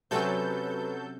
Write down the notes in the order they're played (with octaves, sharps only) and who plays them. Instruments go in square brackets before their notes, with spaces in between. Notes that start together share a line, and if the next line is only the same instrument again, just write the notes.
[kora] C3 C#4 [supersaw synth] F#3 A4 G6 [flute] B4